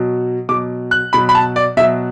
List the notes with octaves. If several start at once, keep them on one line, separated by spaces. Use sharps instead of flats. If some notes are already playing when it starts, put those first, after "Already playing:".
Already playing: B2 F#3
B2 F#3 D6
F#6
B2 F#3 B5
B5
A5
D5
B2 F#3 E5